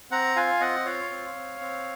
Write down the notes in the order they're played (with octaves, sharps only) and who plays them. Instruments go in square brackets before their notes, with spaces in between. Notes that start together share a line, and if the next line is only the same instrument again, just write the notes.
[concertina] C4 F#5 A#5
F4 F5 G#5
C4 D#5 F#5
F4 C#5 F5
C4
C4
C4